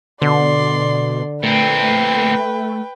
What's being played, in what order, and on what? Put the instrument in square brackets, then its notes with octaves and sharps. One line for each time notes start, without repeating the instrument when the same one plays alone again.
[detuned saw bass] B2 [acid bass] D3 [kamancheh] D5 C6
[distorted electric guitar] A#2 C4 [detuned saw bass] A3 [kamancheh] B4 G5